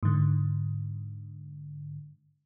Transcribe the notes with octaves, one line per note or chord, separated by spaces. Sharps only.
G#2 D3